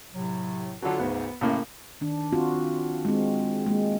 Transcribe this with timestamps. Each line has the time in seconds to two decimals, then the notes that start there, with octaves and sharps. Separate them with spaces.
0.14 A2 C3 F#3
0.82 D3 F#3 E4 F4 A4
0.99 D2 G#2 C#3 B3
1.41 F#2 A2 C#3 A#3
2.01 D#3 D4
2.32 C4 F4 F#4
3.05 G#3 C4
3.66 G#3 A#3